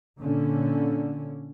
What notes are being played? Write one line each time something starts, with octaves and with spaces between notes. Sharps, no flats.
A#2 D3 C#4